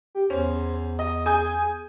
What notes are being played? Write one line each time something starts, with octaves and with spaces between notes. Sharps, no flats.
G4
E2 C#4 C5
D#5 D#6
G#4 G#5 D#6 G6